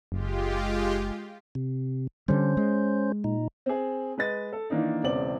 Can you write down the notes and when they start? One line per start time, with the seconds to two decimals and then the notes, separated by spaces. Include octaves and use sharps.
0.12 F#1 G#3 F4 G4
1.55 C3
2.28 D3 G3 C#4 C5
2.57 G#3
3.24 A#2 D#4
3.66 C4 G#4
4.18 G#3 B4 D#5 A6
4.53 A4
4.70 D#3 E3 A#3 D4 D#4
5.03 E1 E2 C#3 C4 D5 F#7